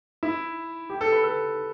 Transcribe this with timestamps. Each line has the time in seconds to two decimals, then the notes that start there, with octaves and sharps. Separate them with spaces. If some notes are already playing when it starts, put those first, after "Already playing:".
0.23 E4
0.90 G4
1.01 A4
1.12 B4
1.24 A4